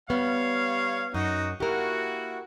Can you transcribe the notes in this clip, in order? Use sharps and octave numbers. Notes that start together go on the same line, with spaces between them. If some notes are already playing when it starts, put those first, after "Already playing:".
G3 B3 C#5 F5
F#2 D#4 F#4
A#3 E4 F#4 G4 A#4